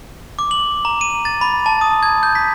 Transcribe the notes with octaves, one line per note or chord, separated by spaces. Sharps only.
D6
F#7
A#5
D#7
A6
B5
A5
D#6
G#6
G6
B6